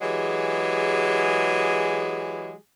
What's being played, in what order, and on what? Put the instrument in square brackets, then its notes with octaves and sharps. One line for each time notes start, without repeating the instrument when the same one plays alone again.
[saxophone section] E3 F#3 G#3 G4 G#4